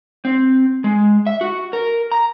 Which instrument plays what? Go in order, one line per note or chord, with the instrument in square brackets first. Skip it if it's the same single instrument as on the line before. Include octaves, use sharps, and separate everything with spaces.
[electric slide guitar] C4
G#3
E5
F#4
A#4
A#5